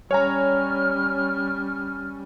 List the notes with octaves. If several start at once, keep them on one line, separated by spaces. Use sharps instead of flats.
G3 C#4 C#5 G#5 A#5 F6